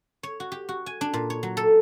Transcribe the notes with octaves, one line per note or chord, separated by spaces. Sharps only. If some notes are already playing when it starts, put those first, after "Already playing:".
C#5
F#4
G4
F#4
G#5
D4
A#2
C#5
F#3
A4